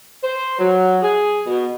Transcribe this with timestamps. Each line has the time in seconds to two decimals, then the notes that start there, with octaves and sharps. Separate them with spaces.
0.23 C5
0.58 F#3
1.02 G#4
1.46 B2